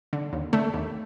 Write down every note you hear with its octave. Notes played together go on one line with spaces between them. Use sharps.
D3
D#2
D3 A3
D#2